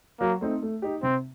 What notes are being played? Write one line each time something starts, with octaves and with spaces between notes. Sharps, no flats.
F#3 A#3
A3 C4 D#4
A3
D#4 G4
C3 C4